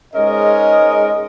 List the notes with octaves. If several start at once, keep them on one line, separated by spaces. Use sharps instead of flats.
G#2 G#3 C#4 A#4 D#5